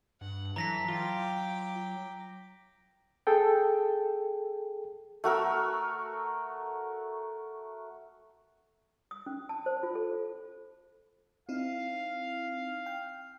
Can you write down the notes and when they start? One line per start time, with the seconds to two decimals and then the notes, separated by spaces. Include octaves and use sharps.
0.21 G2 F#5
0.56 E3 F#3 A4 A#5 A#6 B6
0.88 F4 G5 D6
3.27 G#4 A4 G5
5.24 A3 F#4 A#4 E6
9.11 D#6
9.26 C#4
9.49 A5
9.66 C5
9.83 F4
9.95 A4
11.49 C4 D#4 E4 F5
12.86 G5